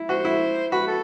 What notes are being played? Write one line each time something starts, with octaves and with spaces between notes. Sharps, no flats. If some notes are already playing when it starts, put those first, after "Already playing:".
Already playing: E4
F#4 C5
E4
F#4 B4
A4